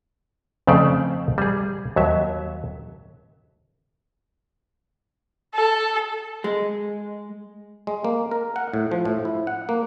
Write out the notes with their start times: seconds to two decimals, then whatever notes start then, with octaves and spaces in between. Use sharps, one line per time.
0.67 F2 C#3 A3 C5 D5
1.38 G3 G#4
1.96 D#2 F#3 E5
5.54 A4
6.44 G#3
7.87 G#3
8.04 A#3
8.31 A#4
8.56 F#5
8.74 A2
8.91 F3
9.05 A2
9.25 E4
9.47 F#5
9.69 A#3